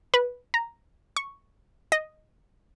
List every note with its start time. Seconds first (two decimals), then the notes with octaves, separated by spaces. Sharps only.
0.14 B4
0.54 A#5
1.16 C#6
1.92 D#5